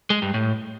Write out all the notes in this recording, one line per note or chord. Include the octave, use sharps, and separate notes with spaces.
G#3
G2
A2